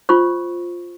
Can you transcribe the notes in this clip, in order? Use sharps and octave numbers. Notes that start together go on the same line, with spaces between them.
F4 C5 C#6